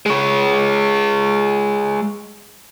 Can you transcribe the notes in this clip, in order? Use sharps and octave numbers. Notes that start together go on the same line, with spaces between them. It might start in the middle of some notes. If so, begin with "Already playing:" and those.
G#3 C#5